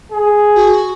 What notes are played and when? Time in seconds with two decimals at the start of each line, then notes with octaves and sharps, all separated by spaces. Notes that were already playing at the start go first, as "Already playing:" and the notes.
0.12 G#4
0.56 F#4